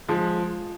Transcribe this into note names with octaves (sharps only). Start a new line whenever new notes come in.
F3 G#3